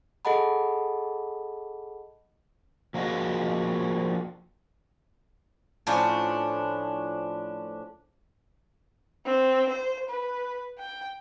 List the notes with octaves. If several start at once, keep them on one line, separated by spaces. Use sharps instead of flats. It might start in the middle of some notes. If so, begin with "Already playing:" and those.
G#4 A4 D#5 F#5 A5 B5
F3 A#3 F#4 G#4 D#5
A2 F3 C#4 D4
C4
C5
B4
G5